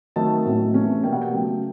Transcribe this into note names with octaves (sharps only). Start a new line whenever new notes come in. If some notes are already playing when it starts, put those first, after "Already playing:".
D#3 F#3 A3 C4 D#4 A5
A2 F#3 A3 C#4
C3 E3 A3 C#4
B2 G3 A#3 G5
F#5
G5
C#3 F#3 A3